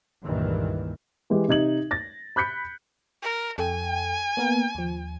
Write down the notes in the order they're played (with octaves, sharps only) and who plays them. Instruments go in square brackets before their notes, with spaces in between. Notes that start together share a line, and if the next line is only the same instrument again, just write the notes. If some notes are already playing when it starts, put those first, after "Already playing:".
[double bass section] C#2 G2 A#2 D#3 E3
[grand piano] E3 G#3 G4
C3 D#4 G#6 F#7
A6 A#6
B5 F#6 G6 B6 C#7
[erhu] A#4
[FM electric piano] F2 A4 G5 [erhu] G#5
[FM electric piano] A#3 B3 A#4
D#2 F3